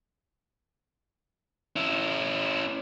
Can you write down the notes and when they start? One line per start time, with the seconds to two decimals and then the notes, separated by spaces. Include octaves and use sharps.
1.76 C#4 E4